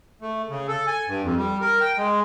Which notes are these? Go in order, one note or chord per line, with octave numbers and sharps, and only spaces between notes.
A3
C#3
A4
G#5
G2
F2
G3
A#4
G5
G#3